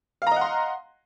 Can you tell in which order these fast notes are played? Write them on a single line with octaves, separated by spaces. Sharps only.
F5 A#5 D#5 F#5 C6